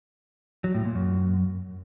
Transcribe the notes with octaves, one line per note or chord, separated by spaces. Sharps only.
F#3
A2
A#2
F#2